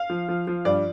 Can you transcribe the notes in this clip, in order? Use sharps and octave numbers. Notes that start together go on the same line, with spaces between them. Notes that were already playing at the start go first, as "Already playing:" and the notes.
Already playing: F5
F3
F3
F3
G2 D5